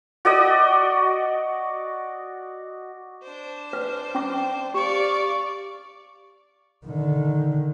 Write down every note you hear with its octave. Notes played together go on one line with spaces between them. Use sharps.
F#4 D5 D#5
D4 C5
B4
C#4 D6
G4 D5 F5 C#6
D3 D#3